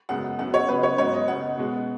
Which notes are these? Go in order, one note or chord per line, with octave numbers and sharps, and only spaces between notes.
F#2 C#3 G#3 B3 F#5
F#2 F#3 B3 F#5
C#5
C#3 F#3 B3 B4
C#5
G#2 F#3 B3 C#5
D#5
F#2 C#3 B3 F#5
B2 G#3 B3